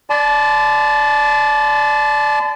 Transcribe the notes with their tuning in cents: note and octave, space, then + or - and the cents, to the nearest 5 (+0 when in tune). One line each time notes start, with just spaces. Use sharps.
D5 +0 A5 -30 C6 -45